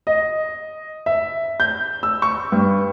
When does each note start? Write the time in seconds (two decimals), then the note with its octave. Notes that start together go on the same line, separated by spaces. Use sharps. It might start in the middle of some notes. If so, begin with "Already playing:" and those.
0.07 D#5
1.06 E5
1.60 G6
2.03 E6
2.22 C#6
2.52 G2